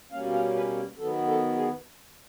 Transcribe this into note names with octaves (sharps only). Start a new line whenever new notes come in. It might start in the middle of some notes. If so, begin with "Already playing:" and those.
B2 G3 A#3 C#4 F5
F5
B4
D#3 F#3 B3 A4
A4
G#4